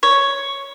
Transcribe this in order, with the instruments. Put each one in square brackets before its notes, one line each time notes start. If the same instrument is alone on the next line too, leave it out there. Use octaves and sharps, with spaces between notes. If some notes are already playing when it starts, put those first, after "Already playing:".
[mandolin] C#5